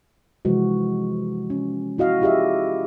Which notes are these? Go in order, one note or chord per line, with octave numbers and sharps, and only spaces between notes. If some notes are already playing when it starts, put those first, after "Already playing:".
C3 E3 F3 G#3 F#4
C#4
E4 F#4 D#5 F5
E4 F4 G4 G#4 D#5 E5